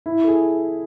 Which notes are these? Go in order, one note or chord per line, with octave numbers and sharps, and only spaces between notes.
E4
A4
G#4